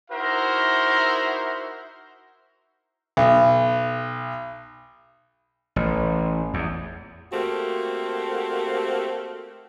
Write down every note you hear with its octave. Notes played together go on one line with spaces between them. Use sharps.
D#4 E4 F#4 A#4 C5 E5
B1
A1
E2
A3 A#3 C4 F#4 G4